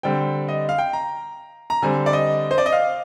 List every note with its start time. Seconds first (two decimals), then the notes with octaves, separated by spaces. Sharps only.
0.03 D3 G3 C4 G5
0.48 D#5
0.69 F5
0.78 G5
0.93 A#5
1.70 A#5
1.82 D3 G3 C4 G#5
2.06 D5
2.13 D#5
2.51 C5
2.58 D5
2.66 D#5
2.72 F5